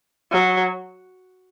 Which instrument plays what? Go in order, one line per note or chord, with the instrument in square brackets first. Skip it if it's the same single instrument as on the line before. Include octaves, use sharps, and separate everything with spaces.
[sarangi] F#3